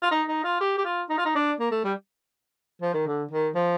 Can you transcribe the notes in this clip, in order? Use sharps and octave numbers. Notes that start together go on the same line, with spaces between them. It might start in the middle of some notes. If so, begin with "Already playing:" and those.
F4
D#4
D#4
F4
G4
G4
F4
D#4
F4
D#4
D4
A#3
A3
G3
F3
D#3
D3
D#3
F3